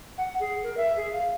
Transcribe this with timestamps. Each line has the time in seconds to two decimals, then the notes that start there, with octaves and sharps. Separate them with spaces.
0.18 F#5
0.40 G#4
0.63 A#4
0.77 E5
0.97 G#4
1.13 F5